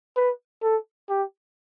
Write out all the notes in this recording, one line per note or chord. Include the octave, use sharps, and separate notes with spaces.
B4
A4
G4